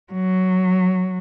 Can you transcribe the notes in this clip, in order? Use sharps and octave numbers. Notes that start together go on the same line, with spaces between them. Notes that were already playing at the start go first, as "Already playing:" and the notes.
F#3